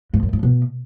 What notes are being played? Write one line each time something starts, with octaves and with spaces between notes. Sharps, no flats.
G#2
F#2
G#2
B2